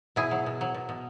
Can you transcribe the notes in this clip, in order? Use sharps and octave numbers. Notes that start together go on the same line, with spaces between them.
B2 E4 G#4
F#3
B2
F#3
B2
B2